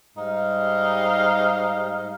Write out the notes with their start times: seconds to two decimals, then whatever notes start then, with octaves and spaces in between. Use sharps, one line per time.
0.17 G#2 G3 D#4 F5